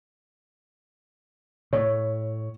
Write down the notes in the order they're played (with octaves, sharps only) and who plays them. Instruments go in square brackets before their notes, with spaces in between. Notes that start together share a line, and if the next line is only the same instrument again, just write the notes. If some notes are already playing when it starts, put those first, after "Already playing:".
[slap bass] A2 [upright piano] C#5